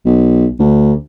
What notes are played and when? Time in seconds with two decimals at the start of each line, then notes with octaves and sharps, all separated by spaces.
0.05 B1
0.59 D2